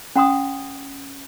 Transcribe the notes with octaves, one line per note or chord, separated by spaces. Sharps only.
C#4 F#5 A#5 C6 D#6